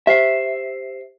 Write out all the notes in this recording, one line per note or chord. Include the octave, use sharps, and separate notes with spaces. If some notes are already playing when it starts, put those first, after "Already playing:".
G4 C5 E5 C7